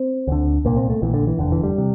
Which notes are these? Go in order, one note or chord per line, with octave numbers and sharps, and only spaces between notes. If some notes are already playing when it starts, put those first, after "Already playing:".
Already playing: C4
D2 D3
C2 A#2 A#3
C4
A3
A#1 A#2 E3
D3
E3
F1 E2 D3
E3
G3
C3